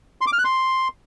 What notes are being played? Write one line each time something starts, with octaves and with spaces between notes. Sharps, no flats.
C6
D6
F6
F#6
C6